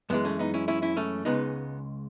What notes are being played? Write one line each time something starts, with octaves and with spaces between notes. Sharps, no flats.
F#2 E3 G#3 B3
A3 C#4
B3 D#4
C#4 E4
C#4 E4
C#4 E4
A3 C#4
C#2 C#3 G#3 B3 D#4